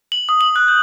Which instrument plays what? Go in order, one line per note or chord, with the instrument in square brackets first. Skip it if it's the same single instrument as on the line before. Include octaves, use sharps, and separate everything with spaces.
[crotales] F#7
D#6
F#7
F#6
G6